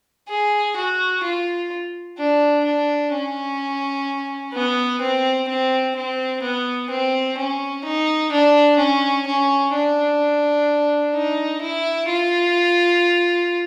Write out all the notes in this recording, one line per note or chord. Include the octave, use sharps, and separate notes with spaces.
G#4
F#4
F4
D4
D4
C#4
B3
C4
C4
C4
B3
C4
C#4
D#4
D4
C#4
C#4
D4
D#4
E4
F4